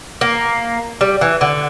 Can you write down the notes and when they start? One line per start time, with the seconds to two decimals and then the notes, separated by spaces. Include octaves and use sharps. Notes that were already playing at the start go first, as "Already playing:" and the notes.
0.21 A#3
1.01 G3
1.21 E3
1.41 D3